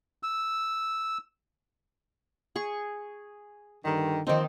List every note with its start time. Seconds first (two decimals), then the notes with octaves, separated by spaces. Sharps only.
0.23 E6
2.56 G#4 C#6
3.85 G2 D3 D#3
4.27 D#3 F3 A#3 C4 D#4